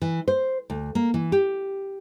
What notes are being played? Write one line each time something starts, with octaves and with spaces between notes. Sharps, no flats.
E3
C5
D2
A#3
E3
G4